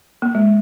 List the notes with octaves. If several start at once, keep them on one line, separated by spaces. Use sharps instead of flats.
A#3
G#3